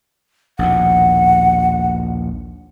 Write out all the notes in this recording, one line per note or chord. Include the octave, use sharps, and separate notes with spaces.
A#1 D#2 B2 F#5